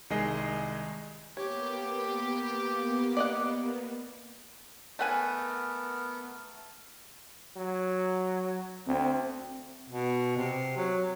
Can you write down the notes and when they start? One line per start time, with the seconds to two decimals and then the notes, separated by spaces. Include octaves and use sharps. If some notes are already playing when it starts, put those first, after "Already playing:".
0.10 C2 D#3 G#3 D#5 G#5 C7
1.37 A#3 B3 G4 C#5
3.17 D5 D#5 F#5
4.99 A3 B3 A#4 F#5 G#5
7.57 F#3
8.87 D2 C4
9.89 B2
10.37 C3
10.77 F#3